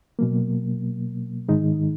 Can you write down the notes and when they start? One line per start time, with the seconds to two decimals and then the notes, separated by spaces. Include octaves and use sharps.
0.19 B2 F#3 A#3
1.49 G#2 D#3 G#3 D#4